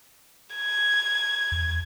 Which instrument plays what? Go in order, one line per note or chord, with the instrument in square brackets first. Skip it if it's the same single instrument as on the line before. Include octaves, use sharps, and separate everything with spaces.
[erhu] G#6
[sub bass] E2